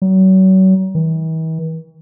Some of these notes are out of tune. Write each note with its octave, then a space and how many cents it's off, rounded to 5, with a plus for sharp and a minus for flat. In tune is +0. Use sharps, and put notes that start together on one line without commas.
F#3 +35
E3 -45